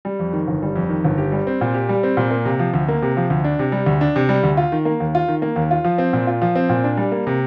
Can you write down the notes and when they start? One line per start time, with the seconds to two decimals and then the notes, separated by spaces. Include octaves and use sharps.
0.05 G3
0.19 F2
0.33 D#3
0.47 G1
0.62 G3
0.76 F2
0.89 D#3
1.05 G1
1.18 G4
1.32 G3
1.47 C4
1.61 A#2
1.74 G4
1.89 G3
2.03 C4
2.17 A#2
2.31 A#3
2.45 C3
2.59 F3
2.74 D2
2.88 A#3
3.02 C3
3.17 F3
3.30 D2
3.44 D4
3.59 C3
3.72 G3
3.86 D2
4.01 D4
4.16 C3
4.29 G3
4.43 D2
4.57 F4
4.72 D#3
4.85 A#3
5.00 D#2
5.15 F4
5.28 D#3
5.42 A#3
5.56 D#2
5.71 F4
5.84 F3
5.98 C4
6.13 A#2
6.27 F4
6.42 F3
6.55 C4
6.69 A#2
6.84 D4
6.97 G3
7.12 A#3
7.27 C3